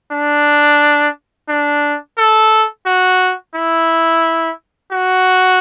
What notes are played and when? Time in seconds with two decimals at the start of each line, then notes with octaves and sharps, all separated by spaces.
0.12 D4
1.49 D4
2.18 A4
2.86 F#4
3.55 E4
4.92 F#4